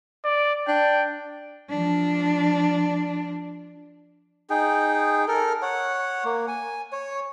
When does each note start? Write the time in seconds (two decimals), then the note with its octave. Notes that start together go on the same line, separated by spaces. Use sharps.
0.25 D5
0.68 D4 G5
1.70 F3 D4
4.50 D#4 G#4 G5
5.28 A4 A#4
5.62 C#5 F#5
6.25 A#3
6.48 G#5
6.92 C#5